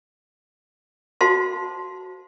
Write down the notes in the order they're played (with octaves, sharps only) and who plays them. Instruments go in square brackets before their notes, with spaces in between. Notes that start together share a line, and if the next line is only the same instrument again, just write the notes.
[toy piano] F#4 C5 F5 A5 C6